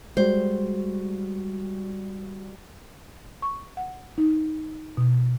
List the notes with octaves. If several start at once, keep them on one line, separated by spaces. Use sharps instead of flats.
G3 G#3 F#4 C5
C#6
F#5
D#4
B2